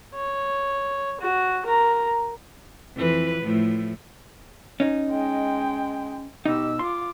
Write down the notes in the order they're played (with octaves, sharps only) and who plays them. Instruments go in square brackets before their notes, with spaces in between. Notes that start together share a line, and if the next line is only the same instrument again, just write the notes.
[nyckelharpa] C#5
F#4
A#4 A#5
[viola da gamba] F2 E3 B4
A2 F3 A3
[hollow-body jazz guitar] C#4 D#4
[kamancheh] G#3 G5
[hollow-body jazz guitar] B2 D#4 [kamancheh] G4 E6
[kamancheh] F4 D6 [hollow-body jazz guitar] C6